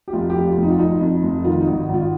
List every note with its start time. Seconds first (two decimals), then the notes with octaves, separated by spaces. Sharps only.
0.08 G4
0.13 F1 F4
0.30 F2 G4
0.46 F4
0.57 F1
0.63 D#4
0.71 F4
0.79 F2 D#4
1.01 F2
1.23 F1
1.45 D#3 F4
1.60 D#4
1.67 G#1
1.88 G#1
1.94 F4